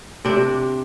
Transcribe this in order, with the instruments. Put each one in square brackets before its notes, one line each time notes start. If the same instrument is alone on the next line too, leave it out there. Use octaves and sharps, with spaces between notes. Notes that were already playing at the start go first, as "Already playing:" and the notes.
[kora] C3 D4